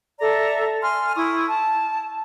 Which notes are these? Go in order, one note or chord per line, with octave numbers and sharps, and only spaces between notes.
A4 D5 E5 A#5
G#5 C6 F6
E4 C#6 D#6
A5